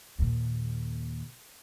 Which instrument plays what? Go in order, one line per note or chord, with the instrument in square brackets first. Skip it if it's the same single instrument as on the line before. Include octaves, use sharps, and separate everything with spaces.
[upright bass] D#2 A#2